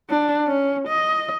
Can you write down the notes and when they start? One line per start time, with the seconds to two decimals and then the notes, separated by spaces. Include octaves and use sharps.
0.10 D4
0.47 C#4
0.88 D#5